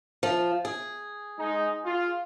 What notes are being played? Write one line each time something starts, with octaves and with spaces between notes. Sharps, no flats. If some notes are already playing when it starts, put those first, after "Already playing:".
F3
G#4
G#3 D#4
F4